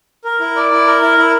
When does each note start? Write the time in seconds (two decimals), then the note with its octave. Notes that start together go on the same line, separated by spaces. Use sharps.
0.24 A#4
0.40 E4
0.56 D5
0.71 E4
0.86 A#4
1.02 E4
1.18 E4